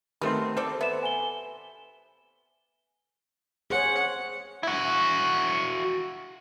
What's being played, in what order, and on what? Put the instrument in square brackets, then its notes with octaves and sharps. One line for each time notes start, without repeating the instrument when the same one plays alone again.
[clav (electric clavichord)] D#3 A3 C4 [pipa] B3 A#4 [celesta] G4 C6
[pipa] G3 C5 D5 [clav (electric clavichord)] A4
[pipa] B3 [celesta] E5 E7
[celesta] G#5 G7
[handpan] G#4 C5 C#5 [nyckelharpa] F#5
[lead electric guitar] E4 F#4